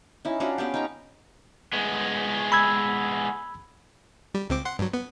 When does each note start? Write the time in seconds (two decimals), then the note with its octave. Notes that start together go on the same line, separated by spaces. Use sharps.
0.25 C#4 D#4 E4
0.40 C#4 D4 F4 F#4
0.58 B3 C#4 G4
0.74 D#4 G5 A#5
1.73 G#3 B3
2.52 B5 E6 G#6
4.34 G3
4.50 C#2 C4 D6
4.65 F#5 C6
4.79 G2 F#3
4.94 B3